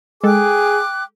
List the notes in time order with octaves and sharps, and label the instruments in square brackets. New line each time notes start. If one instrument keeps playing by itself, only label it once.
[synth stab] G#3 A4 [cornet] G#4 [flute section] G5 D6 F#6